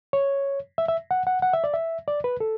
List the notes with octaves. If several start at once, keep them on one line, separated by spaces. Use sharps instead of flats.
C#5
E5
E5
F#5
F#5
F#5
E5
D5
E5
D5
B4
A4